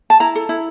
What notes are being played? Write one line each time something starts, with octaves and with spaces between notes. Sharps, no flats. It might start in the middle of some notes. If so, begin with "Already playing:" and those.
A5
E4 A#5
A4
E4